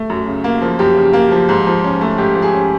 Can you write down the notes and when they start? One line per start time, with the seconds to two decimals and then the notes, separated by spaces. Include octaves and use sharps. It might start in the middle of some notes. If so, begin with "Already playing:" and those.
Already playing: A3
0.10 F#2
0.27 C#3
0.44 A#3
0.62 F3
0.79 F#2 G4
0.97 C#3
1.13 A#3
1.32 F3
1.49 G#2
1.67 F3
1.84 C#4
2.01 A3
2.18 G#2 G4
2.35 F3
2.42 G#4
2.53 C#4